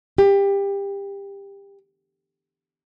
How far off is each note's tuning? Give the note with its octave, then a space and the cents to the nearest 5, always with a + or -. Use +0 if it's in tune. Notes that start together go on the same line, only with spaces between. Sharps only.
G4 +20